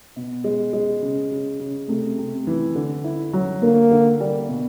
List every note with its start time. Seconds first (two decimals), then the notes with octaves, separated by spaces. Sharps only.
0.16 B2
0.44 G#3
0.73 G#3
1.02 C#3
1.31 C#3
1.60 C#3
1.88 C3 A3
2.18 C3
2.47 E3
2.75 D3
3.04 E4
3.33 F#3
3.62 D3 A#3
3.91 D3
4.20 G3
4.48 B2